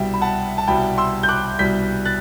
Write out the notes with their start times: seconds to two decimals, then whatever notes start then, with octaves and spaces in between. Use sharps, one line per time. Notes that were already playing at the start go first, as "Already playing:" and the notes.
Already playing: C2 B2 G3 E5 G5
0.14 B5
0.21 F#5 A5
0.58 A5
0.67 C2 B2 G3 G5 B5
0.98 C6 E6
1.23 G6
1.29 D6 F#6
1.59 C2 B2 G3 G6 B6
2.05 F#6 A6